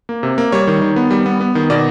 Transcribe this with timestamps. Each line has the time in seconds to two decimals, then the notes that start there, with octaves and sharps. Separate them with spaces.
0.09 A#3
0.23 C3
0.38 A#3
0.52 G3 C#5
0.67 D#3
0.82 D#3
0.96 B3
1.11 G3
1.26 B3
1.41 B3
1.55 D#3
1.70 B2 D5